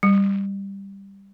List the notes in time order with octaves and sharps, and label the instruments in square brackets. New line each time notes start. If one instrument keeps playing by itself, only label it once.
[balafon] G3